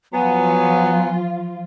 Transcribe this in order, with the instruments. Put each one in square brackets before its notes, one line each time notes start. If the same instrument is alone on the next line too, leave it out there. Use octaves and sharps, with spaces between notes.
[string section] F3 F4 [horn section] F#3 B3 [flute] G#5